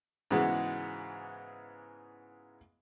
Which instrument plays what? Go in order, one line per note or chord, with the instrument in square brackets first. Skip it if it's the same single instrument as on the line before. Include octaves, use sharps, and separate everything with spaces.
[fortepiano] G#2 C#3 E3 G#3 B3 F#4